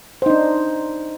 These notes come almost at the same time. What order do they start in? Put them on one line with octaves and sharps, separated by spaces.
C5 D#4 D4